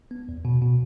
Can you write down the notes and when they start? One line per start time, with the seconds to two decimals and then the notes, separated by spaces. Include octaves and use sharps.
0.11 B3
0.29 E2
0.45 B2
0.62 B2